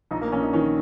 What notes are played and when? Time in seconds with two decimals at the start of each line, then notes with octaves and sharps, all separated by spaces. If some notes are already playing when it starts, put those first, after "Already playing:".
0.11 A#1 D#4
0.21 A#3
0.32 A#1 C#4
0.43 D#4
0.53 D#3 C#4